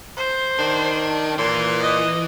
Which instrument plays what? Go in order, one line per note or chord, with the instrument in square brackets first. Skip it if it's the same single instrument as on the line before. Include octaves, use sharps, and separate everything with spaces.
[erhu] C5
[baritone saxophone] D#3 [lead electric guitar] D4
[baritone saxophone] A#2 [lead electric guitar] E3 [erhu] C6
[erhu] D#5